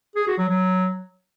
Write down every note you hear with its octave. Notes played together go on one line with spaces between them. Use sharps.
G#4
F#4
F#3
F#3